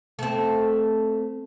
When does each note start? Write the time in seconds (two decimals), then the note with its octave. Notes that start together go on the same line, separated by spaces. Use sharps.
0.19 A3 C4